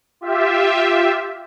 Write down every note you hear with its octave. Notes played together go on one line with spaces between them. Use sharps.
F4 G4 E5